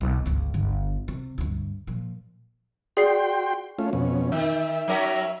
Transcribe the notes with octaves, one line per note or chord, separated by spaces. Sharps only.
B1
G1 C#2
G1 D3
C3
D2 G2
A#2 F3
F#4 G#4 D5 G5 C6 C7
A3 C#4 F4
F2 B2 C#4
D#3 E5
F#3 C#4 A#4